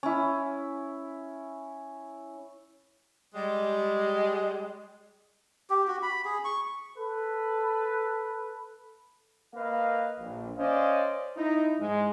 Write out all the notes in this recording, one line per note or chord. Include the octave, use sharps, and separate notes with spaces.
C#4 E4
G3 G#3
G4
F#4
B5
G#4
C#6
A4 B4
A#3 B4 D#5 F5
A#1
C#4 C5 D5 D#5 F5
D#4 E4
G#2 G#3